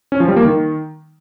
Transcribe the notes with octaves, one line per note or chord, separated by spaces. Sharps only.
C#4
F3
G3
A#3
D#3